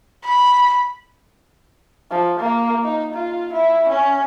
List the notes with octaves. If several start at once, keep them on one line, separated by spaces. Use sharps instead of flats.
B5
F3
A#3
D#4
F4
E4
C#4